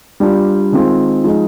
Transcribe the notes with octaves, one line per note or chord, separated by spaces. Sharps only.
G3 D4 F4
D#3 G#3 C4 F4
F3 G#3 D#4